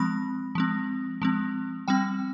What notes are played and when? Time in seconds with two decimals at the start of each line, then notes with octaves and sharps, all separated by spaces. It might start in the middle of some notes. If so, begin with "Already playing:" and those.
Already playing: F3 G#3 C4 B5
0.55 F3 G#3 C4
1.22 F3 G#3 C4
1.88 G3 C4 G5